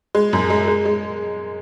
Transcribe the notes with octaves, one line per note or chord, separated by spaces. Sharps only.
G#3
F#2
G#3
G#3
G#3